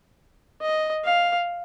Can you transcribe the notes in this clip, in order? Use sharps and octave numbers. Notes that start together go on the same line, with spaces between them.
D#5
F5